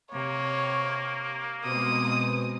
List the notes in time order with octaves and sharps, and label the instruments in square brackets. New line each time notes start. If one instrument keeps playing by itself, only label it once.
[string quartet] C3 [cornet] A#3 [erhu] C#5
[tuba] B2 [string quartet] G#3 C4 [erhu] D#6